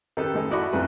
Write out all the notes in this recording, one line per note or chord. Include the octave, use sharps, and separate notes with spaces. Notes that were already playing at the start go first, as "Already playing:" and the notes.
D#3 D#4 G4 A4 B4
A2 G#3 D#4 A4
E4 F#4 D5 D#5 B5 C#6
A1 F2 A4 B4